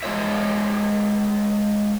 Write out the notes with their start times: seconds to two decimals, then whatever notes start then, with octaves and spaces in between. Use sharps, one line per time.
0.03 G#3 F4 C#5 E5